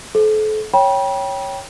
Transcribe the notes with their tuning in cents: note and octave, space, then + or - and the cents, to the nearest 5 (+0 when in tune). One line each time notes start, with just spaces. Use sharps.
A4 -35 C5 +0
C#5 +0 G5 +0 B5 -40